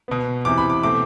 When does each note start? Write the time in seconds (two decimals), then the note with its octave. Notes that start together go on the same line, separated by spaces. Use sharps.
0.08 B2 B3
0.45 E2 C3 E3 D6
0.58 B5
0.70 D6
0.83 B2 A3 C4 D6